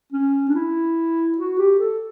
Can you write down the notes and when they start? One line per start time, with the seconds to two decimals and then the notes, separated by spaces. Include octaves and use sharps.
0.12 C#4
0.49 D4
0.55 E4
1.38 F#4
1.58 G4
1.79 A4